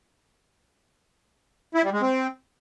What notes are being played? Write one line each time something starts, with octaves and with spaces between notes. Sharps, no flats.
E4
G3
G#3
C4